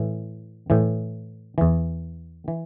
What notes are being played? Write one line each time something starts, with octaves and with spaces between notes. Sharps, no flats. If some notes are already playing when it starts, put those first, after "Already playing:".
Already playing: A2 E3
A2 E3
E2 E3
E3